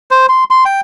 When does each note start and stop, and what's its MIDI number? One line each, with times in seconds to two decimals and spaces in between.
0.11 0.26 72
0.29 0.44 84
0.51 0.64 84
0.65 0.81 79